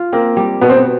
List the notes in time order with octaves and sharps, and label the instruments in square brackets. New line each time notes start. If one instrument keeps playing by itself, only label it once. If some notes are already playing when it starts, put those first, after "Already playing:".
Already playing: [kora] F4
[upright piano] A#3 [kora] C4
[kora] G3
[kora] B2 [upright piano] B3
[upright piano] C4
B3